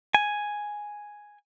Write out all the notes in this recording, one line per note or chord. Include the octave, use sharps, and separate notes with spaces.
G#5